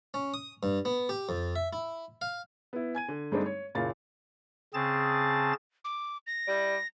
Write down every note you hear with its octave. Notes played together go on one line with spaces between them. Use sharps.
C#4
D#6
G2
B3
G4
F2
E5
E4
F5
B3 E4
G#5 G#6 D#7
D3
G2 G#3 A3 C4 D4 D#4
C#5
F#1 A#2 C#3 F5 A6
C#3 C4 G#4 A5 A6
D6
A#6
G3 E4 D5